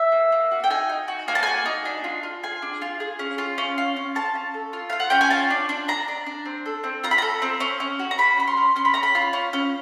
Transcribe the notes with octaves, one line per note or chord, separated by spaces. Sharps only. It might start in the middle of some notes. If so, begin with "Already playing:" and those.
Already playing: E5
A#3
A#3
F#4
G5
D#4 G#5
D#4
F#4
A#3 G#5
A5
F#4 G#5
D#4
D4
F4
F4
G#4 G#5
D4
F4
G#4
C#4
F4
C#4
F4
C#4
C#4 A5
C#4
A4
F4
F4 F5
F#5
C#4 G5
G#5
F4 A5
D4
D4
D4 A#5
D4
D4
C4
A4
C4
F4 A#5
B5
A4 A#5
C4
C#4
C#4
F#4
A#5
F#4 B5
C#4 B5
C6
C#4
C#4 C6
B5
C#4 A#5
B5
F4
C#4
C#4